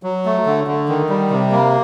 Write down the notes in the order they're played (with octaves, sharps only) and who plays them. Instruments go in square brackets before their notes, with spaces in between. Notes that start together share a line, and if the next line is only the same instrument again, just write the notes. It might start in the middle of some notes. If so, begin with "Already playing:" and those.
[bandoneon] F#3
A3
D3
D3
D#3
G3
C3
A#3